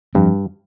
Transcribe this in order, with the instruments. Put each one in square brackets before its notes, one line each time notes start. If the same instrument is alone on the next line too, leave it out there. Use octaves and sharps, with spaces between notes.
[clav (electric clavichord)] G2 [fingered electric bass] F3 C4